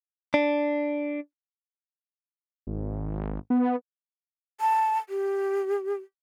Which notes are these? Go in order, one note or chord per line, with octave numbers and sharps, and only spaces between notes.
D4
G#1
B3
A5
G4